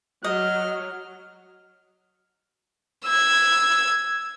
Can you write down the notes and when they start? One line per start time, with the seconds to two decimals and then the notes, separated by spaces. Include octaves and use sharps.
0.24 F#3 D#5 F6
3.05 E6 G#6